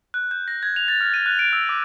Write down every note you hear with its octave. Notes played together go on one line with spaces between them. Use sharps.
F#6
G6
A#6
G#6
F7
A6
F6
D#7
F#6
D7
E6
D6